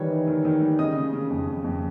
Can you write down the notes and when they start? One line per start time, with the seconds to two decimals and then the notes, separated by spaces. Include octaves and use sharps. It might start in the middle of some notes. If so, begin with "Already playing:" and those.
Already playing: D#3 E3 G3 C#5
0.10 D#4
0.27 D#3
0.45 D#3
0.62 G3
0.79 C#3 D#5 D#6
0.96 C#3
1.13 C#3
1.30 F2
1.47 F2
1.64 F2